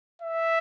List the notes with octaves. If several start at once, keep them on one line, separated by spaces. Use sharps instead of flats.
E5